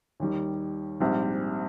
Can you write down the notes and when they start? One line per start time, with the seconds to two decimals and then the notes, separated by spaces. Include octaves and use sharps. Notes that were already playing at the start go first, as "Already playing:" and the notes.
0.20 D#2 D#3 G3
1.00 A#1 G#2 G3 C4